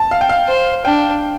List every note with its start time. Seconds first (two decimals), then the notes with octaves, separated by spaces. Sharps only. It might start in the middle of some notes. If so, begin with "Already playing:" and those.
Already playing: A5
0.11 F5
0.21 G5
0.29 F5
0.48 C5
0.85 D4 G5